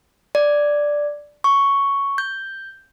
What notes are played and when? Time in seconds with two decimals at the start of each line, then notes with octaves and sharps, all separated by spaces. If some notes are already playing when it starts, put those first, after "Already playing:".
0.35 D5
1.44 C#6
2.18 G6